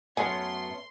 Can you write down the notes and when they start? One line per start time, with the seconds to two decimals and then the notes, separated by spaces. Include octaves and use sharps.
0.17 F#2 A3 B3 C#4 C#5 F#5 G#5 C6